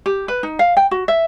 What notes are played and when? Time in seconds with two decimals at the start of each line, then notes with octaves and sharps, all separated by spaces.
0.06 G4
0.28 B4
0.43 D#4
0.59 F5
0.77 G5
0.91 F#4
1.08 E5